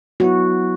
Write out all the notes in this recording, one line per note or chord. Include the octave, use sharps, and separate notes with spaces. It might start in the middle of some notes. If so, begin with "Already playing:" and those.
F#3 B3 E4 F#4